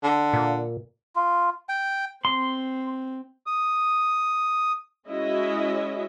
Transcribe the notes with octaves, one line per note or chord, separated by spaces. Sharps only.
D3
A#2
F4
G5
C4 C6
D#6
G#3 C#4 E4 F#4 D#5 E5